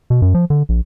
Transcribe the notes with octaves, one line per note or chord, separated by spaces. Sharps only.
B2
F#2
F3
D3
A#1